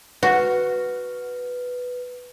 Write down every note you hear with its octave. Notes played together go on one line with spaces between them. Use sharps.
F#4 B4